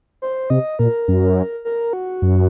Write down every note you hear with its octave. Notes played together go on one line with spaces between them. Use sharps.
C5
C3 D#5
A#2 A#4
F#2
A#4
F#4
F#2